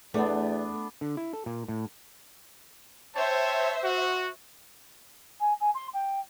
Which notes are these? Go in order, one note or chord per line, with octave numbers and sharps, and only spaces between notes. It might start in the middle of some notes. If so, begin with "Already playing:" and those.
E2 A3 B3 D4
D3
E4
A4
A#2
A2
C5 C#5 E5 G5 A5
F#4
G#5
G#5
C6
G5